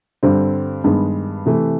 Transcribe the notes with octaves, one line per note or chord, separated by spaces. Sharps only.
G2 D3 G3 C4
G2 D#3 G#3 B3
C3 E3 A3